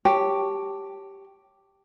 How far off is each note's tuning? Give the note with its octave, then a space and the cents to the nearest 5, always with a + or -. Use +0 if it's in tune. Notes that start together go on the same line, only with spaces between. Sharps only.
G4 +0 C#5 +0 A5 +0